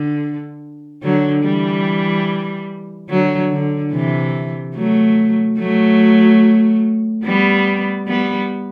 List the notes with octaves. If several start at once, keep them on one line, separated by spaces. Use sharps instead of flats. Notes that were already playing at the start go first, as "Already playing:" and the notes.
Already playing: D3
D3 F#3
E3 G3
D3 F#3
D3
C3 E3
F#3 A3
F#3 A3
G3 B3
G3 B3